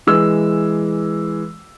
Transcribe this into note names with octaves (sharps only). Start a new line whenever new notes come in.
E3 G#3 E6